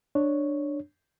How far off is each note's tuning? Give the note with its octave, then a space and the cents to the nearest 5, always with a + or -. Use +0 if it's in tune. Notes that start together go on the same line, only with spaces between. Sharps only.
D4 +10 C#5 +0